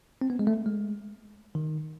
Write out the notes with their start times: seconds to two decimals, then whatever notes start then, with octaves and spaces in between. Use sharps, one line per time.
0.21 C4
0.30 B3
0.39 G#3
0.47 A3
0.66 G#3
1.55 D#3